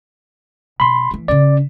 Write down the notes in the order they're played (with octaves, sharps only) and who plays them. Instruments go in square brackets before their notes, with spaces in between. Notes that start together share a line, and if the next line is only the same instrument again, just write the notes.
[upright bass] B2 [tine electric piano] B5 C6
[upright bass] E3 A3
[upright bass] C#3 C#4 [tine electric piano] D5